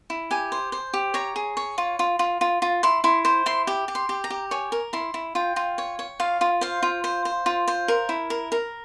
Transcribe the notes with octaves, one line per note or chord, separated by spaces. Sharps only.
E4
G4 G#5
C5
C5
G4
C#5 A#5
G#4
C#5
F4
F4
F4
F4
F4
E4 C6
E4 C6
C5
E4 C6
G4
G4
C6
G4
A#5
G4
C#5 G#5
A#4
E4 C6
E4
F4 G5
F4
C#5
C#5
F4 F5
F4
C5 F5
F4
C5
C5
F4
C5
A#4
E4
A#4
A#4